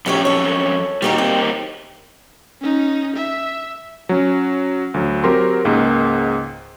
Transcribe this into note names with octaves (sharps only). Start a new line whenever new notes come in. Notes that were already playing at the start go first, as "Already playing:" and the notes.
F2 A2 F#3 C#4 G4 C#5
A4 C#5
G3 A#3 D#4 F#4 G4 A#4
C4
C#4 D#4
E5
F#3 C#4
D2 F#3
F#3 C4 G4 A#4 C6
C#2 G#2 A#3